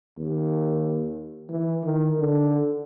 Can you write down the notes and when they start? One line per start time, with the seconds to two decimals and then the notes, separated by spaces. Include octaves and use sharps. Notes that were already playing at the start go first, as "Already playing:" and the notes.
0.18 D#2
1.49 E3
1.84 D#3
2.19 D3